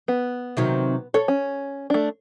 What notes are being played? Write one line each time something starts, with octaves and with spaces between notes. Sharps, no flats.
B3
C3 D#3 F#3
A4 C#5
C#4
A3 D4